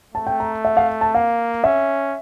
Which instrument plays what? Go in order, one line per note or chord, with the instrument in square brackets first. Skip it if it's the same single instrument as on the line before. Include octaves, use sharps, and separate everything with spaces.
[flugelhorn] A3 [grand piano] A5
[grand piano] G5
A#5
E5
F5
A5
[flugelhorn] A#3 [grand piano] F5
[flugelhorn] C#4 [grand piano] E5